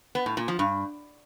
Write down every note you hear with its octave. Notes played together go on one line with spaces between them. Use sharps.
B3
A2
A#2
F3
G2